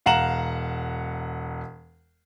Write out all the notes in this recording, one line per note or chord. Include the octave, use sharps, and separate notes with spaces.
E1 F5 F#5 A#5 E7 F#7